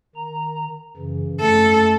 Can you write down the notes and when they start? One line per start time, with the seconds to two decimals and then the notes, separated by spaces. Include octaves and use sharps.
0.16 D#3 A#5
0.97 F#2 C#3 E3
1.41 F#2 A3 A4